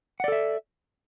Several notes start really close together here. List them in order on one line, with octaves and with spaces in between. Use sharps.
F#5 D5 A4 E5